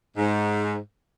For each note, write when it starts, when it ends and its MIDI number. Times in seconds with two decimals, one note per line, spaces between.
0.17 0.78 44